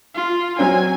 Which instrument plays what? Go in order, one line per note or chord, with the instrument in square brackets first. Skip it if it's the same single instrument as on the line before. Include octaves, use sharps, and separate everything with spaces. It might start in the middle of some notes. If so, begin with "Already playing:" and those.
[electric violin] F4
[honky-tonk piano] F#3 C4 C#4 [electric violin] G#5